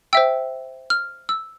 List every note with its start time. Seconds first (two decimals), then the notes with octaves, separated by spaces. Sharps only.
0.13 C5 E5 G5 E6
0.90 F6
1.29 E6